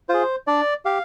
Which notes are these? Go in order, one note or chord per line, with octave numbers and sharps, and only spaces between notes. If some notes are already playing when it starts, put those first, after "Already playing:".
F4 G#4 C5
D4 D5
G4 F5